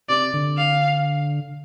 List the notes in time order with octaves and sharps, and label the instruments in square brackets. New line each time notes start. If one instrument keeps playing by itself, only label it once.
[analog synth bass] C3 [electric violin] D5
[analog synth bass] D3
[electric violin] F5